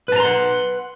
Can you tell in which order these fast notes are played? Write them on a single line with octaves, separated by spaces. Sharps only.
B4 A5 A#5 C6 F#5